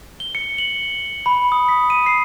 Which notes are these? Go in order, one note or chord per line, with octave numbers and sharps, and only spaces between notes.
G7
C#7
F#7
B5
D#6
B6
D#7
C7